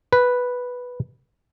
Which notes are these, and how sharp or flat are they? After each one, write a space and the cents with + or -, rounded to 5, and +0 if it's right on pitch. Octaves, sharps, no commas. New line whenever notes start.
B4 -5